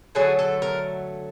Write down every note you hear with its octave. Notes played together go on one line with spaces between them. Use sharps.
D3 F#3 A3 G#4
A4
A#4